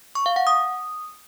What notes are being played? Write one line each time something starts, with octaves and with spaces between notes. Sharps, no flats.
C#6
F5
F#5
D#6